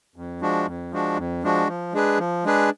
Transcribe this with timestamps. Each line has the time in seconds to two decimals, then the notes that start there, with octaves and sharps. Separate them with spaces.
0.16 F2
0.41 F3 G#3 D4 F#4
0.67 F2
0.92 F3 G#3 D4 F#4
1.18 F2
1.43 F3 G#3 D4 F#4
1.68 F3
1.93 G#3 D4 G#4 B4
2.19 F3
2.44 G#3 D4 G#4 B4